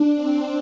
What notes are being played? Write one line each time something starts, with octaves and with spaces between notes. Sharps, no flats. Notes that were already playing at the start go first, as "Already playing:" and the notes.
Already playing: D4
C4